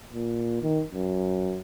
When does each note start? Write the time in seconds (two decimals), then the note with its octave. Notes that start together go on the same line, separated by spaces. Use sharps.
0.12 A#2
0.62 D#3
0.92 F#2